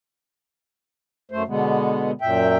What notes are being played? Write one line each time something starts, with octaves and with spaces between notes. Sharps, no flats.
F#2 A3 C5
B2 D3 G#3 B3
F#2 A#2 E5 G5